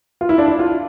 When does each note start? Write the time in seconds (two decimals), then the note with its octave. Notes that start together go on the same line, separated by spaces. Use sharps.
0.21 F4
0.29 E4
0.38 D4
0.46 E4
0.59 F4